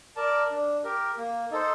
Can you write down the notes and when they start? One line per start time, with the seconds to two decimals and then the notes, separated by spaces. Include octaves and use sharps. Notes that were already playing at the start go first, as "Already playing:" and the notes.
0.16 A#4 D5 A5
0.50 D4
0.84 G4 A#4
1.18 A#3
1.51 D#4 A4 C5